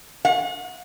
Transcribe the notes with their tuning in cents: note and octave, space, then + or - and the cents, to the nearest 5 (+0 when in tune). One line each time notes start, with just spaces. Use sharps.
F#5 -45